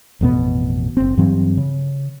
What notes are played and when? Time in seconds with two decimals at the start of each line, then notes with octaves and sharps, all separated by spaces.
0.21 A1 F2 B2 B3
0.97 F#1 C4
1.17 G2 E3 F#3 C4
1.57 C#3